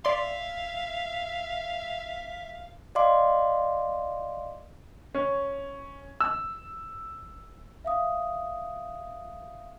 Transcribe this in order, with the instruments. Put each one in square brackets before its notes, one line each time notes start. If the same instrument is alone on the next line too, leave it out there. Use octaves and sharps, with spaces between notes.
[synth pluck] D5 C6 [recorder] E5 [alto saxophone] F5
[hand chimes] D5 D#5 F5 C6 D6
[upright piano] C#4
E6
[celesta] E5 F5 D#6